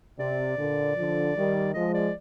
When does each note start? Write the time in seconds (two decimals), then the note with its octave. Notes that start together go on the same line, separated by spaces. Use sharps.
0.19 C3 D5
0.58 A#2 D3
0.96 D3 F3
1.36 D#3 G3
1.74 F3 G#3 D#5
1.94 D5